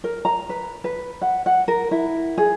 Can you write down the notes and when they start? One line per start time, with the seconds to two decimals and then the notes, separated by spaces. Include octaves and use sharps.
0.04 A#4
0.25 A#5
0.49 B4
0.84 B4
1.22 F#5
1.46 F#5
1.68 A#4
1.91 E4
2.38 G#4